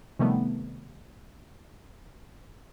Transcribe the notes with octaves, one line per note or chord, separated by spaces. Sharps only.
C3 D#3 F3 G3 A3 B3